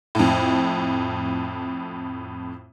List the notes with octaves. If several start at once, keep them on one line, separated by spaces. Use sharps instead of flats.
F2 A2